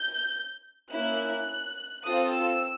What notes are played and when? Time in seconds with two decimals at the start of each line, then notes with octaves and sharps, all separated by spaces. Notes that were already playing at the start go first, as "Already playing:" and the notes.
Already playing: G6
0.91 A#3 C#4 E4 F#6
2.05 C4 F4 A4 D#6
2.33 E6